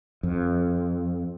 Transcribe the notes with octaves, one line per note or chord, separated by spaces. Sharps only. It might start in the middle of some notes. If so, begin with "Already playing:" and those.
F2